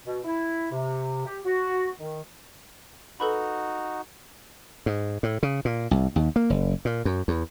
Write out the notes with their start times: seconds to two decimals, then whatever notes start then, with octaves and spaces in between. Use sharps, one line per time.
0.05 B2
0.25 E4
0.71 C3
1.26 G4
1.45 F#4
1.98 D#3
3.20 D#4 F#4 A4 B4 B5
4.86 G#2
5.23 A2
5.43 C#3
5.65 A#2
5.91 C2
6.16 D#2
6.36 A#3
6.50 F#1
6.85 A#2
7.05 F#2
7.28 E2